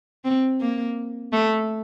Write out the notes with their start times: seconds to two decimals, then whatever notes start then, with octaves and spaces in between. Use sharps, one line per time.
0.25 C4
0.61 A#3
1.33 A3